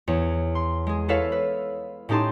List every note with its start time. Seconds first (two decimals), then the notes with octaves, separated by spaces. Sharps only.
0.07 E2 C#5
0.55 C6
0.87 G#3 G#4
1.08 E4 A4 B4 C#5 E5 F5
1.32 B4
2.09 A2 C#4 D#4 G4 A5 C6